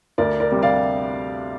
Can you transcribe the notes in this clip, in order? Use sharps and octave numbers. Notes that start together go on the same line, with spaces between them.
D2 A#4 D5
A#4 D5
C3 G3
D5 F5